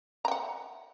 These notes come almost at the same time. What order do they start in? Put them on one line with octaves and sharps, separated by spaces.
A#5 G5 F#5